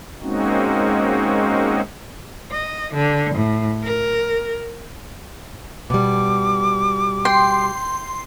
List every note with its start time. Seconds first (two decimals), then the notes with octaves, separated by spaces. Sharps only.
0.21 G#3 A#3 C4 C#4 D#4 F#4
2.51 D#5
2.94 D3
3.34 A2
3.83 A#4
5.90 B2 G3 D6
7.25 G5 C6